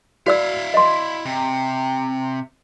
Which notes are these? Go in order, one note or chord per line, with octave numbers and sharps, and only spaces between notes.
E4 F#4 D5 F5 E6
D#5 C6
C3